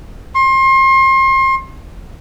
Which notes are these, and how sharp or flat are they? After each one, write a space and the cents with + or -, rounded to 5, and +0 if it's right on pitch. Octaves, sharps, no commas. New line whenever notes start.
C6 +35